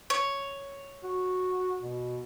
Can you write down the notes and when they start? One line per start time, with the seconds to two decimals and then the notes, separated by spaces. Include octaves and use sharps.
0.10 C#5
1.04 F#4
1.82 B2